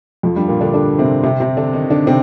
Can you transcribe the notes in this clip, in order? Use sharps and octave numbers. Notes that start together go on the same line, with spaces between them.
F2 F3
G2 G3
A#2 A#3
D3 D4
D3 D4
C3 C4
C3 C4
C3 C4
D3 D4
D#3 D#4
D3 D4
C3 C4